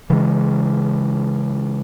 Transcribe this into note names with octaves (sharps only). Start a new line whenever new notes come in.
C#3 E3 G#3